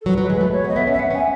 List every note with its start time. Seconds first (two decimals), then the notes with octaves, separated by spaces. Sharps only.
0.01 A4
0.06 F#3 B4
0.18 F#3
0.30 G#3
0.41 A3
0.52 C#5
0.65 B3
0.68 D#5
0.76 B3 E5
0.87 C#4
0.92 E5
0.99 B3 F#5
1.10 C#4 G#5